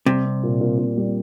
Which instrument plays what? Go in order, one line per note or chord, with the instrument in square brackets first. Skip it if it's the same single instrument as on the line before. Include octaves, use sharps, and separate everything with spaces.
[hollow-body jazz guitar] C3 [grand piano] G3
[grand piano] C4
A#2
A#2
A#2
G3